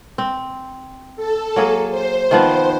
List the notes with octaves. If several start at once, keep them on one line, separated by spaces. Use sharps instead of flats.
C4
A4
F#3 A#3 G#4
C5
D#3 F3 B3